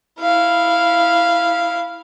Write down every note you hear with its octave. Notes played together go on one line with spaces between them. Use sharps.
E4 F5